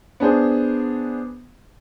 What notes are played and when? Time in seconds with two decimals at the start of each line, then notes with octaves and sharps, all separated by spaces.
0.20 B3 D4 G#4 C5